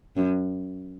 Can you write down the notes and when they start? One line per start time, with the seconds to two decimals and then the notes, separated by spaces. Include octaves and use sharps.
0.16 F#2